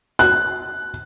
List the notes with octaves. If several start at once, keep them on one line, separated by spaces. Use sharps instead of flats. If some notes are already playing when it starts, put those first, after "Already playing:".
F#6